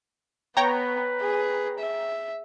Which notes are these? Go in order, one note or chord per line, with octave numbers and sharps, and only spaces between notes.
B3 B4 C#5 G5 A#5
G#4
E5